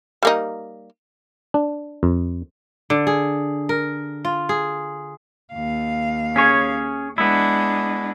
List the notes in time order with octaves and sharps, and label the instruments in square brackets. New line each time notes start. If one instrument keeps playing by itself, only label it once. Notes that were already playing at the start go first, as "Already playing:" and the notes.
[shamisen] G3 A#3 D#4
[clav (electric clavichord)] D4
F2
[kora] D3
G#4
A#4
F4
G#4
[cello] D#2 F5
[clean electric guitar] C#4 G#4 C#5
[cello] G#3 D4 [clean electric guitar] B3 E4